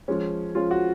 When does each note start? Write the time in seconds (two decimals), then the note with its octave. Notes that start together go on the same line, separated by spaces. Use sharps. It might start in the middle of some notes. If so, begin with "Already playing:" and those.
0.08 F3 G#3 C#4
0.55 F3 G#3 C#4 F4
0.71 F#4